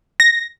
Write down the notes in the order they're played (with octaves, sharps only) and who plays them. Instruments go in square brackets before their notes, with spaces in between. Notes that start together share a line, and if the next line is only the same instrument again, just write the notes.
[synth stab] A#6